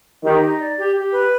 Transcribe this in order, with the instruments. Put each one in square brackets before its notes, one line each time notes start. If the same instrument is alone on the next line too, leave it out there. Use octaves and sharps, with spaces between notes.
[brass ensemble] D#3 [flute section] G4
[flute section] D#4
D5
G4
G4
B4